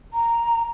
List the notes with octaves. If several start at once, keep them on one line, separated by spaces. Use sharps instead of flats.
A#5